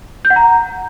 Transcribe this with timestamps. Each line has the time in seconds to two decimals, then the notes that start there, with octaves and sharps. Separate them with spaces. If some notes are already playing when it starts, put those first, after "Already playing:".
0.25 G6
0.30 F#5
0.36 A#5